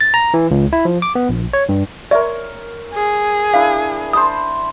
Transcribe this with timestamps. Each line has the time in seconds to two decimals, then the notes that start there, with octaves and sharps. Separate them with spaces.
0.01 A6
0.14 A#5
0.34 E3
0.51 C#2
0.73 E4
0.85 F3
1.02 D6
1.15 B3
1.29 A#1
1.53 C#5
1.69 G2
2.11 A#4 C#5 D5 E5
2.93 G#4
3.54 D4 E4 F5
4.13 C5 A5 B5 D#6